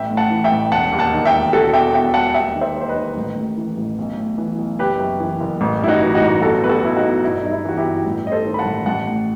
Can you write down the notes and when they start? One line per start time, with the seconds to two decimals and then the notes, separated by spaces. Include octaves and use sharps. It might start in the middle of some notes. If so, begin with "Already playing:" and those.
Already playing: A1 E5 G5
0.11 A2
0.17 F#5 A5
0.30 E3
0.44 E5 G5
0.52 A1
0.72 E1 F#5 A5
0.93 D#2
0.99 F#5 A5
1.13 D#3
1.26 E5 G5
1.32 E1
1.53 E1 F#4 A4
1.73 E2 E5 G5
1.93 B2 E5 G5
2.14 E1 F#5 A5
2.34 D#2 E5 G5
2.55 D#3
2.61 C5 E5
2.75 D#2
2.81 C5
2.88 B4 D#5
2.96 D#3
3.17 A1
3.36 A2
3.57 E3
3.77 A1
3.98 B1
4.17 A2
4.38 E3
4.58 B1
4.79 F#1 G4 B4
4.99 F#2
5.20 E3
5.40 F#1
5.61 A1
5.81 G2 E4
5.88 D#4 F#4
6.01 E3
6.15 D#4 F#4
6.22 A1
6.42 B1 F#4 A4
6.62 B2 B4
6.69 F#4 A4
6.83 B1 E4
6.97 D#4 F#4
7.03 B2
7.24 G1 E4
7.43 G2 D#4
7.51 E4
7.65 E3 F#4
7.77 E4 G4
7.85 G1
8.05 A1 E4
8.26 G2 D#5
8.32 A4 C5
8.45 D#3
8.54 B5
8.59 F#5 A5
8.66 A1
8.86 A1 F#5 A5
9.08 A2